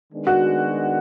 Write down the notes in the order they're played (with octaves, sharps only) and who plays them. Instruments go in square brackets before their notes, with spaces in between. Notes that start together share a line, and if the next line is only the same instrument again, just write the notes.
[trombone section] D#3 G#3 B3 D4
[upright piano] F#4